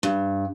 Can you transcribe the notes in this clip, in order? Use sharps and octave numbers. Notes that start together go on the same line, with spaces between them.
G2